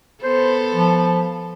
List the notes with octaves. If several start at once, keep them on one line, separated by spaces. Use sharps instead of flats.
B3 A4 C5
F3